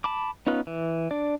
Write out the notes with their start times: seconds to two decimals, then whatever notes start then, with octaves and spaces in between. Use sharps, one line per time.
0.04 A5 B5 D6
0.47 B3 C#4 D#4 F4 B4
0.67 E3
1.11 D4 D5